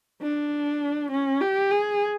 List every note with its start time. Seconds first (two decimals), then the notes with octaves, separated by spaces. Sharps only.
0.22 D4
1.12 C#4
1.41 G4
1.71 G#4